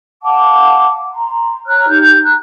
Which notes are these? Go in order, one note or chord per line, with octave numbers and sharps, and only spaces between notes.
F5 F#5 A5 D6
A#5 C6
C#5 A#5 F6 F#6
D#4 G4 G6
A#5 F#6